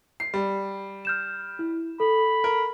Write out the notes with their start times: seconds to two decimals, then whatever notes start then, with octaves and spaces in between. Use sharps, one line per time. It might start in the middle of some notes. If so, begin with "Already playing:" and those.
0.20 C7
0.34 G3
1.05 F6 G6 E7
1.59 E4
2.00 A4 B5
2.44 A#4